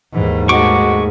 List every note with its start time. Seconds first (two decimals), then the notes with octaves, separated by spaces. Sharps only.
0.14 D#2 G#2 E3
0.49 G#3 A3 F#4 C#6 D6